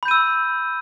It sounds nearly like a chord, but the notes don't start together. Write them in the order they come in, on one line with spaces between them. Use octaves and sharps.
B5 G6 D#7 E6